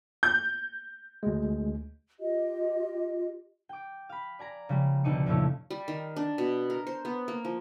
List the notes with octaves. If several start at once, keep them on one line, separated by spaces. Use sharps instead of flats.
G6
D2 G#3
F4 G4 D#5
G5 D6
F5 B5
D5 G#5 A#5
C#3 F3 G3 G#3
D2 B2 D#4 D5 D#6 C#7
F2 A#2 C#3 A3 C#4 E4
G3
D#3
D4
B2
A#4
C5
B3
A#3
F3